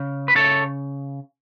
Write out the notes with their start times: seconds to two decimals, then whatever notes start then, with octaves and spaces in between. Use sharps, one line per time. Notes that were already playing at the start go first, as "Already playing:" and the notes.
Already playing: C#3
0.28 B4
0.35 C#3 A4 C#5